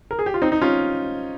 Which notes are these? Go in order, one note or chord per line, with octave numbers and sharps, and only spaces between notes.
A#4
G#4
G4
F4
C4 D#4
D#4
C#4 F4